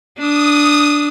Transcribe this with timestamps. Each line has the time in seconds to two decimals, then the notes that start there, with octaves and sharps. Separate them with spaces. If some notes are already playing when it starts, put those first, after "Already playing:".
0.18 D4 D#6